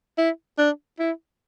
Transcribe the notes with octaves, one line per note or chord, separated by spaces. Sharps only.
E4
D4
E4